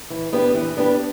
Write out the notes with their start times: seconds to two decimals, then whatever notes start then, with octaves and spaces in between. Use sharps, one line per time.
0.10 E3
0.33 B3 D4 G4 B4
0.54 E3
0.77 B3 D4 G4 B4